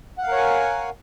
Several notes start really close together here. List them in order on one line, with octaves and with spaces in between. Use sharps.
F#5 F5 A#4 C#5 G#5